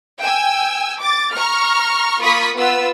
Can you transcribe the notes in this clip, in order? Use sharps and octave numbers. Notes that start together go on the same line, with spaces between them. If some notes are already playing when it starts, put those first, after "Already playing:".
G5 G#5 E6
D6 A6
A#5 C#6 F6
A#3 F4 B5 C#6 D#6 B6
B3 F4 B4 E6